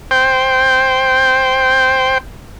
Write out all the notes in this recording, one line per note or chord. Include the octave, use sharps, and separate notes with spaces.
C5 G5